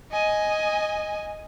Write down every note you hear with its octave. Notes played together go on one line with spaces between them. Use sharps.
D#5 G#5